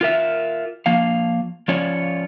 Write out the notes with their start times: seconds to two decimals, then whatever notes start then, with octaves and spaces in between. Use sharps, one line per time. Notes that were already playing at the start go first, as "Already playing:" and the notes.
0.01 F4 A#4 E5
0.86 F3 A#3 F5
1.68 F3 C#4 F4 C#5 D5